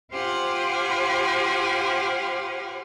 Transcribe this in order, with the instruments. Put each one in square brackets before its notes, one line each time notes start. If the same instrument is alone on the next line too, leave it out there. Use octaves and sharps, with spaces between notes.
[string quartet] F4 G4 C5 F5 F#5 G#5